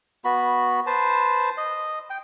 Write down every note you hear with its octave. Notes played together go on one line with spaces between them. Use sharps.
B3 F#4 B5
B4 C5 A5
D#5
G5